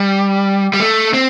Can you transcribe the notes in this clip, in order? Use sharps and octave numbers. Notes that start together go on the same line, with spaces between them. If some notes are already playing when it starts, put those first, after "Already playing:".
Already playing: G3
G3
A3
C4